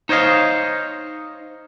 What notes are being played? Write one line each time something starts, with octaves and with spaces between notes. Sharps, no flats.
D#4 C5 C#5 D#5 F5